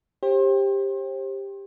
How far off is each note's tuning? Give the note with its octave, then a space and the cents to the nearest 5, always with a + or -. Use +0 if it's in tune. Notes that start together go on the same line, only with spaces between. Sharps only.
G4 +10 C5 +35